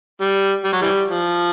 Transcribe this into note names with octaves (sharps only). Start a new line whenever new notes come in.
G3
G3
F#3
E3 G3
F3